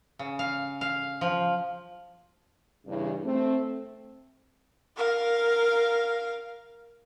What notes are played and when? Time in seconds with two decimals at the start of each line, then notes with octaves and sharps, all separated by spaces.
0.19 C#3
0.39 F5
0.81 F5
1.21 F3
2.87 E2 G2 C#3
3.25 A3 C4
4.97 A#4 F5